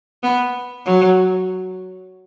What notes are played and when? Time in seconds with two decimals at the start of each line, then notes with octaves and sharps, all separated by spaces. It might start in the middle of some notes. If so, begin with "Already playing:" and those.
0.23 B3
0.86 F#3